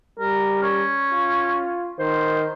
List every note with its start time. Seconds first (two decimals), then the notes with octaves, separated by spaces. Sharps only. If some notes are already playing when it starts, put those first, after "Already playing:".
0.20 G3 A#4
0.63 C#4
1.13 F4
1.99 D#3 C5